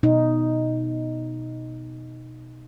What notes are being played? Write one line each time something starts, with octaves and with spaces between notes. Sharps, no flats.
B2 D#4